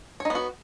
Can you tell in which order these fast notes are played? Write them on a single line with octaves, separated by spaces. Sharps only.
C#5 D#4 B3 F#4